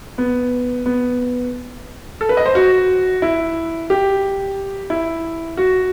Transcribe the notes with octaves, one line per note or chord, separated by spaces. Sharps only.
B3
B3
A4
B4
D#5
C5
F#4
E4
G4
E4
F#4